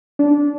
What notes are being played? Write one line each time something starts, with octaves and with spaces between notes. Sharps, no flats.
D4